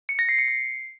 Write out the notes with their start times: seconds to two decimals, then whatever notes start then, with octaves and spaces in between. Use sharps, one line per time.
0.09 C#7
0.19 A#6
0.29 C7
0.38 C#7
0.48 C7